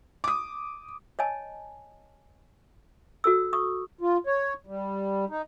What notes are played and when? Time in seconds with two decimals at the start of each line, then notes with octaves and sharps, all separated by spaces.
0.24 D6 D#6
1.19 C#5 D#5 G#5 A5
3.24 F#4 A4 E6
3.53 C#6 D#6
4.01 F4
4.27 C#5
4.67 G3
5.30 D#4